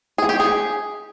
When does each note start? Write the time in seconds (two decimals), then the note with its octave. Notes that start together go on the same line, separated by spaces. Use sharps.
0.18 G#4
0.29 G4
0.40 G#4